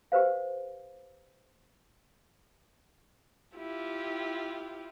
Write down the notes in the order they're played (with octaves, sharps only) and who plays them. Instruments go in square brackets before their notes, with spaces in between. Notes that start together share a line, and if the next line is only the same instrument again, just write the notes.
[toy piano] G4 B4 C5 F5
[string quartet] E4 F4 G4